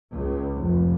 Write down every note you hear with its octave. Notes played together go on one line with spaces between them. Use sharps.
C#2
F1